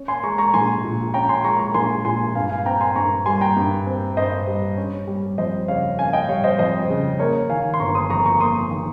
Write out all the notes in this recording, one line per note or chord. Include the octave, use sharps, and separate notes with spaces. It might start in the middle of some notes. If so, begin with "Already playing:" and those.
Already playing: C#4
G#5 C6
G#3 A#5 C#6
A#5 C#6
A#1 G#5 C6
A#2
C#4 G5 A#5
G#5 C6
G#3 A#5 C#6
A#5 C#6
A#1 G#5 C6
A#2 G#5 C6
G2 F5 G#5
F5 G#5
C4 G5 A#5
G#5 C6
G2 A#5 C#6
G3 G#5 C6
G5 A#5
G2
C4
G2 C5 D#5
G3
C#4
G3
F2 C5 D#5
C#3 C#5 F5
C#4 F5 G#5
D#5 G5
G3 C#5 F5
C5 D#5
F2 C5 D#5
C#3
A#3 A#4 C#5
D#3 F5 G#5
C6
G1 A#5 C#6
C6 D#6
F2 A#5 C#6
A#5 C#6
A#3 C6 D#6
D#3